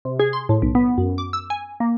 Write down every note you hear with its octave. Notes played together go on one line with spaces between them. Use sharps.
C3
G#4
C6
A2
B1
B3
F#2
D6
E6
G#5
A#3